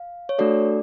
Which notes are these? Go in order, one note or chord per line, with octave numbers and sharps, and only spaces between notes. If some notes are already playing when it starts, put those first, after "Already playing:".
Already playing: F5
C#5
A3 D4 F#4 A4 D5